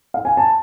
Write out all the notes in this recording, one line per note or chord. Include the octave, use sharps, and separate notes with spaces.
F5
G#5
A5